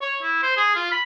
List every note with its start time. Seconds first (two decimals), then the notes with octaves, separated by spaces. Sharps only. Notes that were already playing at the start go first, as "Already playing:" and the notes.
0.01 C#5
0.22 E4
0.42 C5
0.57 G#4
0.75 F4
0.91 B5